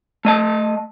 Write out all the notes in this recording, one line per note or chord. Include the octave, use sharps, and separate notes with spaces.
A3 D#5 A5